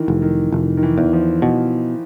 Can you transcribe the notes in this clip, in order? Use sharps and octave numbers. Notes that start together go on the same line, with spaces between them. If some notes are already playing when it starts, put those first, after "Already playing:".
Already playing: D#3 E3
F1
D#3
F1
D#3
E3
E2
F3
B2